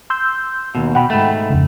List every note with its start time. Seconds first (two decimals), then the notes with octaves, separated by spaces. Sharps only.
0.10 C6 E6 G6
0.75 D#2 B2
0.95 B2 F#5 G5 B5
1.10 G#2 A3
1.50 F2 C#3